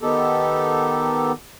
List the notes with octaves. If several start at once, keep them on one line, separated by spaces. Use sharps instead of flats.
D#3 B3 D#4 G4 A4